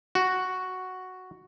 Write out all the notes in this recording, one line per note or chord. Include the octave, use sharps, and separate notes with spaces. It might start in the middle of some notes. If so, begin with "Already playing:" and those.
F#4